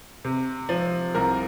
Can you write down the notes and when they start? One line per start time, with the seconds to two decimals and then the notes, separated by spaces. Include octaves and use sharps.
0.25 C3
0.69 F3
1.15 C2 A#4